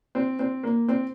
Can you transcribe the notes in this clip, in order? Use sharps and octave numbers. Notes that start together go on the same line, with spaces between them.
C4
C4
A#3
C4